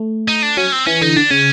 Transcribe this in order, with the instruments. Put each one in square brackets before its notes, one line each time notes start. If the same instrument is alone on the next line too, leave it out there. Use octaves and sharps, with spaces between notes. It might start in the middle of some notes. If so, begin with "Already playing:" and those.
Already playing: [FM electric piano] A3
[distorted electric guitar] D#4
D4
[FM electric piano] F#3 [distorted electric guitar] C#4
[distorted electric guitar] C4
[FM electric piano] E3 [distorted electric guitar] C#4
[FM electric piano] D3 [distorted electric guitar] D#4
[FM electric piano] D3 [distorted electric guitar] D4
[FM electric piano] C#3 [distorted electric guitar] C#4